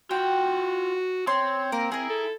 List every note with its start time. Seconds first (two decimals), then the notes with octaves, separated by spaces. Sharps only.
0.11 F4 F#4 F#5 G5
1.27 C4 C#5 C6
1.72 A#3 A#4
1.92 C4 E4 G#4 A#4
2.10 A4